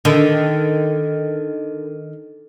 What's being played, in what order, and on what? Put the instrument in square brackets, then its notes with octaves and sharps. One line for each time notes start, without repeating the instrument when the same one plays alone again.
[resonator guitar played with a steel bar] D3 [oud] D#3